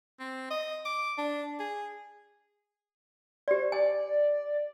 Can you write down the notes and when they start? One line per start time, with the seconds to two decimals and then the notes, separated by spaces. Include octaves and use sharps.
0.20 C4
0.51 D#5
0.85 D6
1.18 D4
1.60 G#4
3.48 G4 C5 D5
3.72 D5 G#5